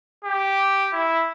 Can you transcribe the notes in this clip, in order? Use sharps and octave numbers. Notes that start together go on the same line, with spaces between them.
G4
E4